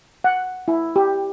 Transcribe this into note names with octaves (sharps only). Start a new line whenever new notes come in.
F#5
E4
G4